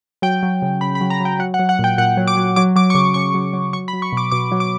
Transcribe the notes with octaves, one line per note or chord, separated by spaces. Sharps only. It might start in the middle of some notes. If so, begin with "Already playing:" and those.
F#3 G5
F#3
C#3
C#3 B5
B5
F#3
A#5
F#3 G5
F#3 F#5
F#5
F#3
F#5
A#2
G5
A#2 F#5
F#3
D6
F#3
F#3 D6
F#3 D6
C#6
C#3 D6
C#3 C#6
F#3
F#3
F#3 C#6
B5
F#3
C#6
B2 D6
B2 D6
F#3
D6